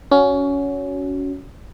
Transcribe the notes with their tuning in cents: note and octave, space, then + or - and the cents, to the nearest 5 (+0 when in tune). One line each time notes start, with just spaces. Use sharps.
C#4 +20 F#4 +0